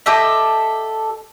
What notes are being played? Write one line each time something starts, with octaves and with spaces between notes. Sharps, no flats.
G4 A4 D#5 E5